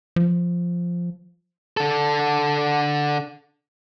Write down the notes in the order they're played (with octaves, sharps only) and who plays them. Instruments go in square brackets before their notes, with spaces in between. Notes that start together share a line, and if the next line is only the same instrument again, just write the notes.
[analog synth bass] F3
[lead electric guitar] D3 A4